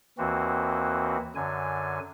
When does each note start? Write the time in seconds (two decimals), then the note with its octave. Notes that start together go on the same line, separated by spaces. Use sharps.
0.18 D#2 E3 C4 F#4
1.35 F#2 D3 G#5